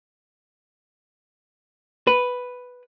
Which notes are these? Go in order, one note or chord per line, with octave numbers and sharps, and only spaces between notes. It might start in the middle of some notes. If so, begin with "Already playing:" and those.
B4